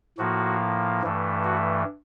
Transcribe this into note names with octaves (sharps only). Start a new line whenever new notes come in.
A2 F3 A#3 F#4
G2 E3 A3
F#4